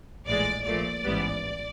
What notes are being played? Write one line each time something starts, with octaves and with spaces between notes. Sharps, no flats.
A#1 A2 E3 G#3 D5
A#1 A#2 F3 A3 D5
A1 G#2 E3 G3 B3